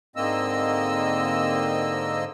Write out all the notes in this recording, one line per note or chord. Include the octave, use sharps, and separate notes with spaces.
G#2 D3 A#3 C4 D#5 E6